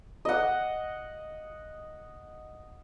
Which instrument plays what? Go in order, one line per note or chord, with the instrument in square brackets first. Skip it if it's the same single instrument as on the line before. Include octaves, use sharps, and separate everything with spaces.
[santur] D#5 F#5